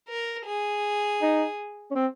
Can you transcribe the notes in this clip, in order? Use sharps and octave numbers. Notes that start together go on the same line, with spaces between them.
A#4
G#4
D#4
C#4
C4